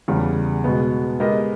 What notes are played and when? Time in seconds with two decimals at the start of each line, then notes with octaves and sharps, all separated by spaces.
0.08 E2 C#3 G3
0.64 B2 G#3 B3
1.20 G#3 B3 G4 A#4 D#5